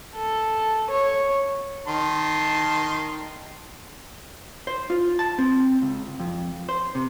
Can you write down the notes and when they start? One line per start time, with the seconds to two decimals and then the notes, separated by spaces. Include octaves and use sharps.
0.15 A4
0.91 C#5
1.87 D#3 A5 C6
4.67 C5
4.90 F4
5.19 A5
5.39 C4
5.82 C#2
6.20 F2
6.69 C5
6.95 C3